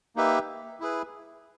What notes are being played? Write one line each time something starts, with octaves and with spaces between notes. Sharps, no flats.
A#3 D#4 G4 B4 E5
E4 G#4 B4